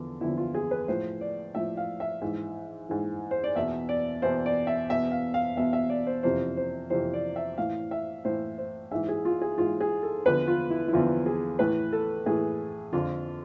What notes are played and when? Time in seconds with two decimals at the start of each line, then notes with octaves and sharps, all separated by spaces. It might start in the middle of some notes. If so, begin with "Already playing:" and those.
Already playing: E2 D3 F3
0.21 E2 D3 F3 E4
0.37 F4
0.54 G#4
0.71 B4
0.88 A2 F3 C5
1.21 D5
1.55 A2 F3 E5
1.77 F5
2.00 E5
2.21 G#2 E3
2.89 G#2 E3
3.31 C5
3.44 D5
3.56 E2 B2 E5
3.89 D5
4.22 E2 B2 C5
4.46 D5
4.67 E5
4.90 E2 B2 E5
5.12 F5
5.34 F5
5.56 E2 B2 E5
5.73 E5
5.90 D5
6.07 C5
6.23 F2 C3 E3 C5
6.57 C5
6.90 F2 C3 E3 C5
7.14 D5
7.36 E5
7.58 A2 E3 F5
7.91 E5
8.24 A2 E3 C5
8.58 C5
8.91 G#2 E3 E5
9.09 G#4
9.25 F4
9.42 G#4
9.58 G#2 E3 F4
9.81 G#4
10.03 A4
10.26 E2 D3 F3 B4
10.47 F4
10.70 E4
10.88 E4
10.92 E2 D3 F3 F4
11.26 G#4
11.59 A2 E3 B4
11.93 A4
12.26 A2 E3 G#4
12.93 F2 D3 F3 F4